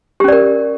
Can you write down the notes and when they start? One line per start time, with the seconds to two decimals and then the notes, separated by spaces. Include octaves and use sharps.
0.20 G4
0.24 C#4
0.28 D5
0.32 A#4